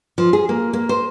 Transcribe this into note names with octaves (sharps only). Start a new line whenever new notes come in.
F3
G#4
A#3
A#3
C5